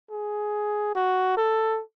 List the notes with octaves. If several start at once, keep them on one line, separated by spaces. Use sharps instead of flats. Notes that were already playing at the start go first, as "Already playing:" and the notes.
G#4
F#4
A4